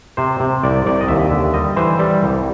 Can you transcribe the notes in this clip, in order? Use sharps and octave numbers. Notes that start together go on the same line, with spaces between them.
C3 C5
C3
C2 D5
C2 D5
D#5
D#2 E5
D3
G3 D#5
E3 C5
G3
C2